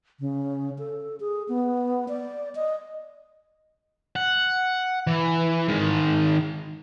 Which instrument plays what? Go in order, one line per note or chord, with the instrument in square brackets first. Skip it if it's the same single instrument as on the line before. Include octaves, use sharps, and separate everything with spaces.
[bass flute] C#3
A4
G#4
B3
D5
D#5
[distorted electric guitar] F#5
E3
D#3 G#3